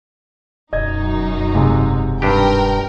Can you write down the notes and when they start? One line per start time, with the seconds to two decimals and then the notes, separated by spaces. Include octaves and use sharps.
0.73 E1 F#2 D#4 D#5 G#6
1.55 G#2 C3 G#3
2.22 G2 D4 G4 A#4 G5